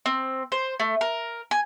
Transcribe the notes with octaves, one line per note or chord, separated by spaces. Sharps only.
C4
C5
A3
A#4
G#5